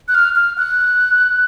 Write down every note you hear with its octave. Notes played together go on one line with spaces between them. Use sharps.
F#6
F6
F6
F#6